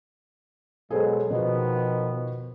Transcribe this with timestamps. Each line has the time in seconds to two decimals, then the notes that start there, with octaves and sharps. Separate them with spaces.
0.90 B2 F#3 G#3 G#4 A4 C5
1.30 B2 D#3 F3 B3 F#4